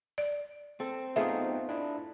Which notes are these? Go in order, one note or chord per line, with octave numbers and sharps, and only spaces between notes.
D5
C4 A4
A3 B3 D#4 F4 G#4 E5
D4 E4